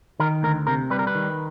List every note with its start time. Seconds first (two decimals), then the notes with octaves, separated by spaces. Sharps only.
0.20 D#3 A#4
0.43 D2 A#4
0.67 C3 A#4
0.90 G3 B4
0.99 A#4
1.07 B4
1.15 D#3